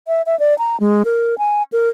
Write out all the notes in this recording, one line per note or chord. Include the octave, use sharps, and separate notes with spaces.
E5
E5
D5
A#5
G#3
A#4
G#5
A#4